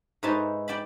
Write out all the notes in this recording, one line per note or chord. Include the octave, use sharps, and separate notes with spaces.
G#2 D#4 B4 C#5 E5 A5
D5 G5 A5 B5